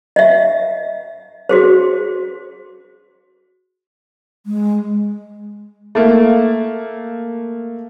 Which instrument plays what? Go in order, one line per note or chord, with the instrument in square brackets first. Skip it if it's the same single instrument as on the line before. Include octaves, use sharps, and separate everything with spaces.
[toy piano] D#5 E5
F#4 G#4 C5
[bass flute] G#3
[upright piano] A3 A#3